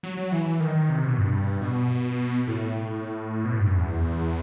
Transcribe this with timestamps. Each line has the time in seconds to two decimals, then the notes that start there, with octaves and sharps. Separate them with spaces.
0.03 F#3
0.17 F#3
0.32 E3
0.46 E3
0.60 D#3
0.75 D#3
0.89 C3
1.04 B2
1.18 G2
1.61 B2
2.47 A2
3.45 B2
3.52 A2
3.60 G2
3.69 F#2
3.77 E2